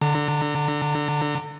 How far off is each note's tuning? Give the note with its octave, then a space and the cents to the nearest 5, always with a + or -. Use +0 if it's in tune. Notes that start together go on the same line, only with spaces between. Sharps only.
D3 +0 A#5 -35